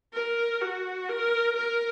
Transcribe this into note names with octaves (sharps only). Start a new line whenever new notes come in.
A#4
F#4
A#4
A#4